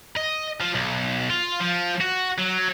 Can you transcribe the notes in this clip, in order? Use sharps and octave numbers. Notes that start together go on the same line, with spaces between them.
D#5
F3
B1
F4
F3
F#4
F#3